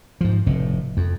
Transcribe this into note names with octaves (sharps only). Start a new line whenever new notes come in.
G#2 F3
F1 A2
F2